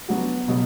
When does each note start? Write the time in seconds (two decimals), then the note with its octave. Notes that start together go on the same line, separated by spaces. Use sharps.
0.08 F#3 B3 D4 F#4
0.48 B2 F#3